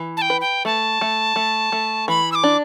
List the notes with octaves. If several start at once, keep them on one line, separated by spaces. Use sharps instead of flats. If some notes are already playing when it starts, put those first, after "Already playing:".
Already playing: E3
A5
G5
B4
G5
A3 A5
A3
A3
A3
E3 B5
E6
D6
D4